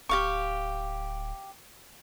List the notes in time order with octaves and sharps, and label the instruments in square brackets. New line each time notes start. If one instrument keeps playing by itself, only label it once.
[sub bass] D1 [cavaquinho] G4 F5 C#6